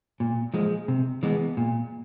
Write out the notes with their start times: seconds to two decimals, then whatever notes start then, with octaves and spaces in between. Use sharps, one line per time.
0.20 A#2
0.54 F3 G#3
0.88 C3
1.23 E3 G#3 B3
1.57 A#2